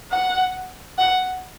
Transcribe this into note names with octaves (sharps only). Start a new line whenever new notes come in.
F#5
F#5